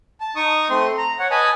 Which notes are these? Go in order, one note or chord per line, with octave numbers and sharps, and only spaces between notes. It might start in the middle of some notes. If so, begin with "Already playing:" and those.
A5
D#4 C#6 D#6
A3 C4 C6
A#5
C#5 F#5
B4 D#5 G#5 A5 B5